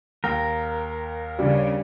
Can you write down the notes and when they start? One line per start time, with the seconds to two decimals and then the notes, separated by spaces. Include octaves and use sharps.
0.24 D#2 A#4 G5
1.39 C#3 G3 D4